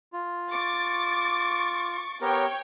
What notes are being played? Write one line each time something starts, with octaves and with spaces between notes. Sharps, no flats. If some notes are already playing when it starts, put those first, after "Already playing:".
F4
C#6 D6 A6
B3 G4 A#4 C#5 G5